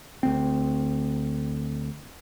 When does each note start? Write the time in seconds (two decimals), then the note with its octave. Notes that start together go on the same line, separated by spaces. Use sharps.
0.23 D2 C4